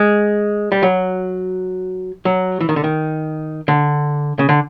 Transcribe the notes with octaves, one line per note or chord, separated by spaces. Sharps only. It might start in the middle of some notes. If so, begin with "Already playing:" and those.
Already playing: G#3
G3
F#3
F#3
E3
D#3
D3
D#3
D3
C#3
D3